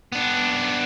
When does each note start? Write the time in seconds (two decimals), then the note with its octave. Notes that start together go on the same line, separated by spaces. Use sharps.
0.12 B3 D4